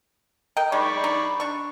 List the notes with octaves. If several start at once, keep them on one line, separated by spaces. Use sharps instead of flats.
A#4 D#5 G5
G#3 D#4 D5 B5 C#6
D#4
D4 C#6